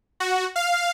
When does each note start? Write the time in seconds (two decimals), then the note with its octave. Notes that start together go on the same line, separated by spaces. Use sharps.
0.20 F#4
0.56 F5